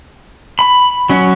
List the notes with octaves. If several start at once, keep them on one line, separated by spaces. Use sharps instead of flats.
B5
F#3 C#4